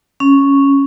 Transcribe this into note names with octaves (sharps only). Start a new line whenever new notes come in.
C#4